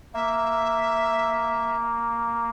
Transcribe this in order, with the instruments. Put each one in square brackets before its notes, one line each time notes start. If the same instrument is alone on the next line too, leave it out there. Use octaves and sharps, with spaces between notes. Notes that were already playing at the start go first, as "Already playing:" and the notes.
[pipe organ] A#3 [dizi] E5